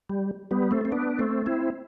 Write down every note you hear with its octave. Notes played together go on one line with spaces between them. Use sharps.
G3
G3 B3
A3 C4
C4
B3 D4
A3 C4
C4 E4